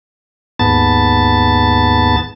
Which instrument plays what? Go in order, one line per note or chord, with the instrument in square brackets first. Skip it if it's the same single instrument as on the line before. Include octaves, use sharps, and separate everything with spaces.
[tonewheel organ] D#2 G#2 B3 A5 A6